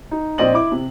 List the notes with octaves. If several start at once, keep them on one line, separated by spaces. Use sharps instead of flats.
D#4
A#1 C4 D5 D#5 F#7
E4 D6
C3